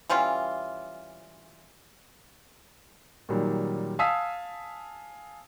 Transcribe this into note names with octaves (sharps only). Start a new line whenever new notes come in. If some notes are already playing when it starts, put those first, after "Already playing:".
E3 G3 C#4 F4
A#2 D#3 F#3 G3
F5 G#5 A5 D#6 E6 B6